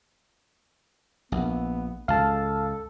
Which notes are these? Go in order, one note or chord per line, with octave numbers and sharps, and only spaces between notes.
A#1 B3
C#2 G#2 A4 F5 A5